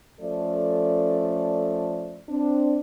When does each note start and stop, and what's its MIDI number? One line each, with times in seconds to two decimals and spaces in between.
0.20 2.22 53
0.20 2.22 57
0.20 2.22 61
0.20 2.22 69
0.20 2.22 74
2.29 2.79 60
2.29 2.79 62